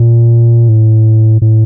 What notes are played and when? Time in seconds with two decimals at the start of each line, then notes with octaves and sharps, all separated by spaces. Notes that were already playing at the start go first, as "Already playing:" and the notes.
Already playing: A#2
0.69 A2
1.42 A2